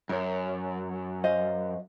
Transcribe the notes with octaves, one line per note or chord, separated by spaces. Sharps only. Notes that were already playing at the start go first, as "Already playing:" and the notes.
F#2 A#4 C#5
C5 D#5 F5